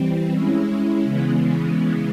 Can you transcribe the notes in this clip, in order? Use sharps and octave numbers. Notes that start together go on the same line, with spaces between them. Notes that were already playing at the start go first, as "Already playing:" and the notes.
Already playing: E3 G3 C4
G#3 C#4 E4
C#3 E3 G#3 B3